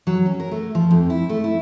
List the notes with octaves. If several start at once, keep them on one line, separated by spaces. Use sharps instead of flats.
F#3
C#4
A#4
A3
F3
F2
E4
A3
E4